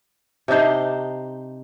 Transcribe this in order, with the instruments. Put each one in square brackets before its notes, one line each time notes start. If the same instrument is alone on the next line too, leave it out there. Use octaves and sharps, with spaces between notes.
[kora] C3 D4 D#4 C5